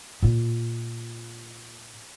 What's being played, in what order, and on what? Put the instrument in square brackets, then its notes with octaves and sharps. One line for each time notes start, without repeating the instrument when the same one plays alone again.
[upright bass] A#2 F4